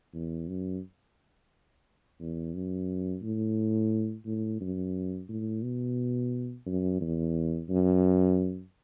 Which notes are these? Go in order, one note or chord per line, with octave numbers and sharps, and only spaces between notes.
E2
F#2
E2
F#2
A2
A2
F#2
A2
B2
F#2
E2
F#2